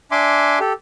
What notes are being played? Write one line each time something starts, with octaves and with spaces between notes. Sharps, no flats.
D4 E5 G#5 C6 D6
G4 A4